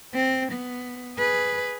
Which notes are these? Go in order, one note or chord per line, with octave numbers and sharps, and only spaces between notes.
C4
B3
G#4 B4